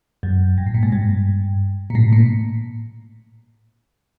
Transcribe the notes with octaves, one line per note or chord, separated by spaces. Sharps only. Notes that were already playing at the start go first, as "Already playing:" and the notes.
F#2
G2
A2
A#2
G#2
G2
A#2
A2
A#2